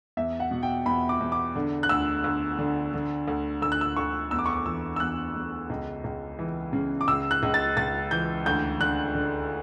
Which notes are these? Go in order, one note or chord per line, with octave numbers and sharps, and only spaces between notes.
E2 E5
F#5
B2
G5
E2 B5
D6
E2
D6
D3
F#6
D2 E6
D2
D3
D3
D2
D2 E6
F#6
E6
D2 C#6
E2 E6
D6
C#6
D6
E3 E6
E6
E2 F#6
E2
C#2
C#2
E3
C#3
D6
C#2 E6
F#6
C#2
A6
C#2 A6
E3 G6
D2 G6
D3 F#6
D3